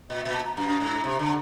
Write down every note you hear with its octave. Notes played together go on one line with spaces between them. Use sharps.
A#2 D#5
A#2 E5
A5
A#5
F#2 A#5
G#2
C3
D3